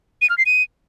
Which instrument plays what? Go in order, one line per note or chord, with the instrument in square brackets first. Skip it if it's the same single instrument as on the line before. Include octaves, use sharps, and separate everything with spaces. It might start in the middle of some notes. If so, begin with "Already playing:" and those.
[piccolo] D#7
F6
C7
D#7